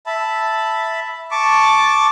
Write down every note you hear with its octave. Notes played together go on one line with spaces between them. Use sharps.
E5 A5 B5
A5 C#6 D6